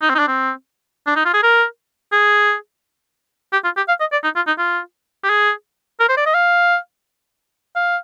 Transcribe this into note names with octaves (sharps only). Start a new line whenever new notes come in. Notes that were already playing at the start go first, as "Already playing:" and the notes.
D#4
C4
D#4
D4
C4
D4
D#4
F4
G#4
A#4
G#4
G4
F4
G4
F5
D#5
D5
D#4
F4
D#4
F4
G4
G#4
A#4
C5
D5
D#5
F5
F5